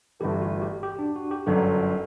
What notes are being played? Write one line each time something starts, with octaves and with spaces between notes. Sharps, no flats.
G1 G2 E3 A3 G4
F#4
G4
G4
D4
F#4
G4
G1 F#2 D3 F#3 A4